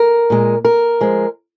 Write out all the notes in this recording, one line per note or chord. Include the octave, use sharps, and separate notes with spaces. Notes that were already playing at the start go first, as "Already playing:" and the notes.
Already playing: A#4
A#2 G#3
A#4
F3 G#3